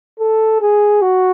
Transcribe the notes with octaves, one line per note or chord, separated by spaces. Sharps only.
A4
G#4
F#4